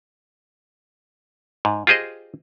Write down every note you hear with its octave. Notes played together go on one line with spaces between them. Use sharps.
G#2
F4 G4 G#4 C5 D#5